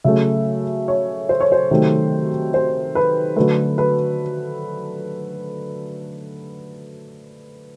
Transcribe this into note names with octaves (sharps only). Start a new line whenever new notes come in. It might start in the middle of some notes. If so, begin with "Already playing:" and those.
C#3 F#3 A3 E5
C#5
C5
C#5
C5
C3 D#3 F#3 A3
C5
B4
D3 F#3 A3 B4
B4